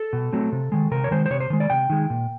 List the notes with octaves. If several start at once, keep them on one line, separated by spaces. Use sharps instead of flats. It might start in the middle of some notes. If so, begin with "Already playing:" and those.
Already playing: A4
B2
F#3 A3 C4
C3
D#3 G#3
C3 A#4
C#5
D#3 G#3 C5
C5
C3 C#5
C5
D#3 G#3
D5
C3 G5
D#3 G#3
A#2